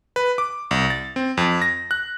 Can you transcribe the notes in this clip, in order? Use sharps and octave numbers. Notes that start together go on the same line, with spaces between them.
B4
D6
C2
A6
C4
F2
A#6
F#6